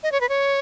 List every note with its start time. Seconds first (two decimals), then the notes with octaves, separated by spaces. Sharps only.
0.03 D#5
0.12 C#5
0.21 B4
0.29 C#5